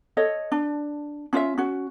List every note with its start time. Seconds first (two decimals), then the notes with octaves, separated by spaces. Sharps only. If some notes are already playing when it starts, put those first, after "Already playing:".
0.17 A4 C#5 D#5
0.52 D4
1.33 C#4 F4 D5 E5
1.58 C#4 F#4